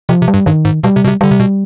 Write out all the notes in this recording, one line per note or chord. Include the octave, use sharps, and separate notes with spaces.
C3 F3
C3
G3
G2
G2 D#3
G#2
B2 G3
C3
B2
C3
D3 G3
C3
B2